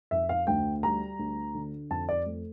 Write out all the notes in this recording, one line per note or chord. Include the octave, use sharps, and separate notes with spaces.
F2 E5
F5
D2 G5
G3 A#5
D2
D3
F2 A5
D5
A3